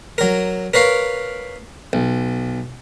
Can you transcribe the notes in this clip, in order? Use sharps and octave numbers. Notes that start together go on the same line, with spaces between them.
F#3 A#4
A#4 B4 C#5 F5
B1